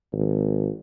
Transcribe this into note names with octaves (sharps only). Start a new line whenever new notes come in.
G#1